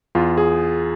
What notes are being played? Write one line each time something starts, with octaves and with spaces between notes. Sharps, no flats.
E2 F4
G#4